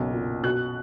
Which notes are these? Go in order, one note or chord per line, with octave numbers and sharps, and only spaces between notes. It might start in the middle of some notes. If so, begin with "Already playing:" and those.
Already playing: F#1 B1
A#2
B2 F#6